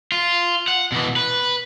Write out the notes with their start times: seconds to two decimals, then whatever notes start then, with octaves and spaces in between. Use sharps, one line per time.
0.12 F4
0.68 F#5
0.92 B2 E3
1.16 B4